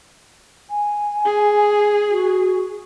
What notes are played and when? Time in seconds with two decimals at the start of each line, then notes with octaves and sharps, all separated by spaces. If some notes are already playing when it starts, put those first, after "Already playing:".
0.70 G#5
1.26 G#4
2.10 F#4